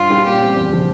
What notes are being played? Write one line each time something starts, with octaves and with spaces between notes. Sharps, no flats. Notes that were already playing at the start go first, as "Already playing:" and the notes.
Already playing: G2 F4
G3 C#4 E4 G4
A#2 G4
G3 C4
E2
C#3 F3